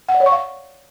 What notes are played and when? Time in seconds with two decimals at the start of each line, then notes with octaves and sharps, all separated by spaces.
0.09 F#5
0.14 D5
0.20 C#5
0.26 C#6
0.32 F5